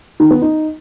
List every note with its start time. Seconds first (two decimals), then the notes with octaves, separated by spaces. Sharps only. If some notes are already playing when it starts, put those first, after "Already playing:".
0.20 D#3
0.31 B3
0.42 D#4